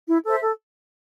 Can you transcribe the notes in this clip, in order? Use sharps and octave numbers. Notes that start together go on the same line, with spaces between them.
E4
A4 C5 E5
A4